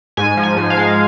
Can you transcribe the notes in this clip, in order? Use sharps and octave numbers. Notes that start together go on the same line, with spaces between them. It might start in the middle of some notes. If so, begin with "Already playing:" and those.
G#2 G#5
F3
G#5
G#2
F5
G#3